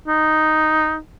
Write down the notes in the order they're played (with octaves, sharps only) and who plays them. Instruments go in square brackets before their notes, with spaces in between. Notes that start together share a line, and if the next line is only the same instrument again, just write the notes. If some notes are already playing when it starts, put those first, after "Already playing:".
[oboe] D#4